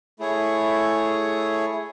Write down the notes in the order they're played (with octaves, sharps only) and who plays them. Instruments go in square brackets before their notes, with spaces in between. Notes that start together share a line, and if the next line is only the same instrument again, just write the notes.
[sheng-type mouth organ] A3 E4 G#4 C#5